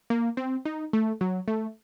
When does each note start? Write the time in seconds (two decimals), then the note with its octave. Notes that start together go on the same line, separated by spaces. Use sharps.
0.10 A#3
0.37 C4
0.65 D#4
0.93 A3
1.21 F#3
1.48 A3